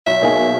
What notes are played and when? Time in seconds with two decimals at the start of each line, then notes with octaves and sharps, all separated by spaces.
0.07 B1 E5
0.22 B2 A#3 D#4 G#4